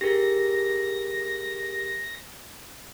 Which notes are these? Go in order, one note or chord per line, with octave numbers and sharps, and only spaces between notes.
G4 G#4 A#4 A#6